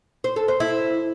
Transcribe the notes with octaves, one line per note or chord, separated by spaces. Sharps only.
C5
A4
C5
E4